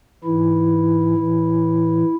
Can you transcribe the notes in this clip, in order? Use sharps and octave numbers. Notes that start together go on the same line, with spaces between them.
G#2 E3 E4
A2 E3